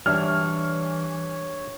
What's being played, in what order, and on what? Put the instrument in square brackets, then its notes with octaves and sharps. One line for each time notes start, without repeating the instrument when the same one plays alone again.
[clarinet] E3 [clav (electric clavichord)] G3 D4 E5 [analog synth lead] C#5 [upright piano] F6